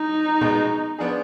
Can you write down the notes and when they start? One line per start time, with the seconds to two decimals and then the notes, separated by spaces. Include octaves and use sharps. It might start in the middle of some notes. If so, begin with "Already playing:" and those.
Already playing: D#4
0.41 B2 G#3 B3
0.99 F3 B3 D4 G#4